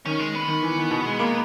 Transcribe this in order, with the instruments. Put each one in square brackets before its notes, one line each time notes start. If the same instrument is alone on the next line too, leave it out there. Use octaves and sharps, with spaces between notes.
[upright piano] D#3 [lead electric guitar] C#4
[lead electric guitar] G#3
B3
[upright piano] D#3
E3
D#3
B2
G#3
A#3